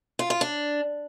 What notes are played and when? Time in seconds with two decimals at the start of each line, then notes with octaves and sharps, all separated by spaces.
0.19 F4
0.30 F4
0.41 D4